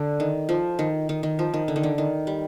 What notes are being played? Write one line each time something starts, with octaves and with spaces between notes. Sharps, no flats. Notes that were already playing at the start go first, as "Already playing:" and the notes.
Already playing: D3
D#3
F3
D#3
D#3
D#3
F3
D#3
D3
D#3
D3
D#3
G3